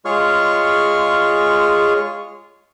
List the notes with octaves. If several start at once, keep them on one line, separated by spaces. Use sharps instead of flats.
G#3 F4 G#4 C#5 C#6 F6